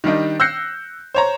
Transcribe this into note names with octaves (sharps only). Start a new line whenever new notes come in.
D#3 G3 D4 D#4
E6 F#6 G6 A#6 C7 C#7
C5 C#5 A#5